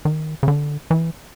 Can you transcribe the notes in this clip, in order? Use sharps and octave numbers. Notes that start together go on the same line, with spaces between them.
D#3
C#3
D3
E3